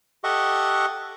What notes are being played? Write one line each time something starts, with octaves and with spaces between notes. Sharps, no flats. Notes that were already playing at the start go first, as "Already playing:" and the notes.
G4 A4 D#5 E5 F#5 C#6